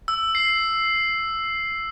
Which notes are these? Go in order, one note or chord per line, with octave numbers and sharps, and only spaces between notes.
E6
C7